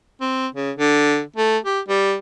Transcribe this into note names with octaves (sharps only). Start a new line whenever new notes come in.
C4
C#3
D3
A3
G4
G3